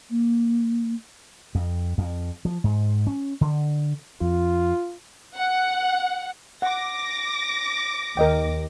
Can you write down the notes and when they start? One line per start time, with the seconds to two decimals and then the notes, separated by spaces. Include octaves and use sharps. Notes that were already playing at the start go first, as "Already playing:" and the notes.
0.10 A#3
1.55 F2
1.98 F2
2.45 F3
2.64 G#2
3.07 C#4
3.41 D3
4.21 F2 F4
5.37 F#5
6.62 F#5 D6 A#6
8.17 D#2 A#4 D#5 G5